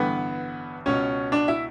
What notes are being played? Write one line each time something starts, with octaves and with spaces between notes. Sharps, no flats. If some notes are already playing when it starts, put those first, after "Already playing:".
Already playing: A1 G2 D3 B3 B4
C#2 B2 C#4 C#5
D4 D5
E4 E5